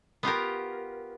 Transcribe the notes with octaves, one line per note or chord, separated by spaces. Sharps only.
B3 F4 G4 A#4